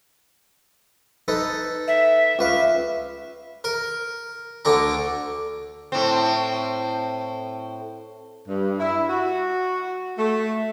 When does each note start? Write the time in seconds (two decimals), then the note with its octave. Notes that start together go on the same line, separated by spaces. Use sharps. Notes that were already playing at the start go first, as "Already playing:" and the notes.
1.28 D#4 A4 B4
1.88 E5
2.39 C#2 B4 F5
3.64 A#4
4.65 D2 D3 D4 A#5
5.92 A2 C4
8.47 G2
8.79 E4
9.09 F#4
10.17 A3